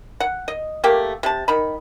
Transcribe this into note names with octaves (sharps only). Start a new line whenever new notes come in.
F#5
D#5
A3 A#3 G4 G5
C3 A5
D#3 B5